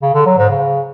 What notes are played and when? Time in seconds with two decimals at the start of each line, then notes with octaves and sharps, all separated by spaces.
0.02 C#3
0.14 D3
0.26 F#3
0.38 G#2
0.50 C#3